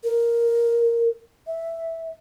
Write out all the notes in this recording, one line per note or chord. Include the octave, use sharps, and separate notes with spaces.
A#4
E5